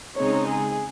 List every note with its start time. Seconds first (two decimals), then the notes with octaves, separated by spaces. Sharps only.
0.16 C#3 G#3 C4 D#4 C#5
0.48 G#4